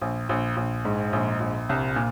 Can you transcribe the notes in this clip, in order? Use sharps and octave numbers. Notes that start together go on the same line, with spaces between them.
A#1
A#1
A#1
G#2
A#1
A#1
C2
A#2